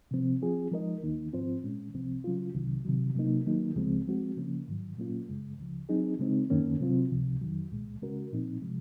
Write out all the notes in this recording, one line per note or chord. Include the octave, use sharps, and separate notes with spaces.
C3 F3 C4
F3 C4 F4 G#4
F3 G#3 D#4 A#4 D#5
D#2 D#3 A#3 D#4
G#2 F3 C4 F4 C5
A#2 G#3 C#4
C2 C3 F3 C4
C#3 F#3 C#4 F4
C2 C3 D#3 F#3
C3 D#3 F#3
C3 F#3 A#3 D#4
D#3 F#3 A#3 D#4
C#2 C#3 F3 G#3 C4
F3 G#3 C4 F#4
C#3 F3 A#3 C#4
G#2 D#3 F#3
A#2 F#3 A#3 C#4 F4
F#2 C#3 G#3
C#2 C#3 F3
F#3 C4 D#4 G#4
C#3 G#3 C4 D#4
F#2 D#3 A#3 C#4
C3 F#3 C4 F4
C#2 C3 F3
F2 D#3 F#3
C2 A#2 G#3
C#3 G#3 C#4 F#4 A#4
A#2 F3 C4 D#4
C3 F3 G#3